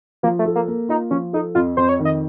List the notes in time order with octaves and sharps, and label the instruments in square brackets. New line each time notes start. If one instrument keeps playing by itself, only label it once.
[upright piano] F3 [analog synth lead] A#3
[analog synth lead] A3
[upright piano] A4
[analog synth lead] A#3
[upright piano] A#3
[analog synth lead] D#4 [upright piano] F4
[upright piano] F3 [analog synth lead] C#4
[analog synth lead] D#4 [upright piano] A4
[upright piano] F2 [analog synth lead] F4
[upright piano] F2 [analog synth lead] C5
[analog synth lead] C#5
[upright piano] D#3
[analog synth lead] D#5